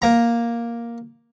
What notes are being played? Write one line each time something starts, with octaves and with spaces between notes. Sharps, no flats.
A#3 A#5